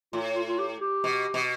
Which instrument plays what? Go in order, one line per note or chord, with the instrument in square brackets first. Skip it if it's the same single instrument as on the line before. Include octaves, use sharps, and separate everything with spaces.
[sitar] A2 [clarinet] F4
[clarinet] F4
F4
G4
G4
[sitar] B2
B2